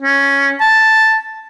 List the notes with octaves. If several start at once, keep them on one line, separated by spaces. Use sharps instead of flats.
C#4
A5